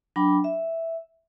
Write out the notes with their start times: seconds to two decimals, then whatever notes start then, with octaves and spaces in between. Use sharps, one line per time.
0.16 F#3 D4 G5 B5 D6
0.44 E5